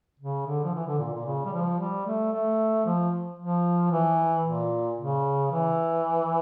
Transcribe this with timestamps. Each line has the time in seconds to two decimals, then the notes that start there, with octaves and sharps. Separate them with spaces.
0.20 C#3
0.46 D3
0.64 F3
0.75 E3
0.86 D3
0.99 A#2
1.13 A#2
1.26 C#3
1.46 G3
1.53 F3
1.80 G3
2.06 A3
2.33 A3
2.86 F3
3.39 F3
3.92 E3
4.45 A#2
4.98 C#3
5.51 E3